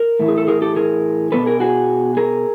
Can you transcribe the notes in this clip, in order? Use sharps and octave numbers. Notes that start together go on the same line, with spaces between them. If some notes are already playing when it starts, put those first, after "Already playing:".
Already playing: A#4
A2 E3 A3
G#4
A4
G#4 A#4
G4 A4
G#4 A#4
B2 G3 B3 D4 A4 B4
G#4 A#4
F#4 G#4
G#4 A#4